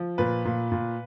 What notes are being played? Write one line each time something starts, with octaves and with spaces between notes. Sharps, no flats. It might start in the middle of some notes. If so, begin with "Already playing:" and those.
Already playing: F3
A#2 B4
A#2
A#2